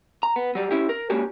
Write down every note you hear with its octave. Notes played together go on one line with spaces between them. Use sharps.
A#5
B3
F#3 G3
C#4 E4 G4
A#4
G#3 A#3 C#4 D4 F#4 G4